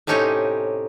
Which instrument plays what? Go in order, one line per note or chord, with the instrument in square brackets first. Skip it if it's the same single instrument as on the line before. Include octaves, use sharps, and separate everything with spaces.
[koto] A2 C3 C#4 D#4 G4 C#5